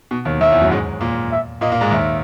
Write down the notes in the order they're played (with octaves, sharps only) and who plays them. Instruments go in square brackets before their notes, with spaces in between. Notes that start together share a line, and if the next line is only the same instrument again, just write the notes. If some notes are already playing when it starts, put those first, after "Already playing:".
[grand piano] B2
D#2 D#3
[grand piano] D#2 D#3 [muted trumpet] E5
[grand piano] E2 E3
F#2 F#3
G#2 G#3
A#2 A#3
[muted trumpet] E5
[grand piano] A#2 A#3 [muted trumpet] D#5
[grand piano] A#2 A#3
G#2 G#3
[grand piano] D#2 D#3 [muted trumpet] E5